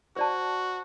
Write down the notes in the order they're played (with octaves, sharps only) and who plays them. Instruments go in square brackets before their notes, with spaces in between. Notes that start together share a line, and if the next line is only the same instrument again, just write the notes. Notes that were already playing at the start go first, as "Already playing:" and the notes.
[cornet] F#4 [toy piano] C5 D5 A5